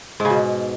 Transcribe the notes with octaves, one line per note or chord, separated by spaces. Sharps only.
G#2
C#3
B2